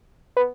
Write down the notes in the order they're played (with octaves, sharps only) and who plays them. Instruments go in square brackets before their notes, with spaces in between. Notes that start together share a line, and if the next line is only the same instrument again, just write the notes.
[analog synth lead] B3